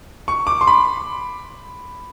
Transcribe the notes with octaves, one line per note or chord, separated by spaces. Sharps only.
C#6
D6
C6
B5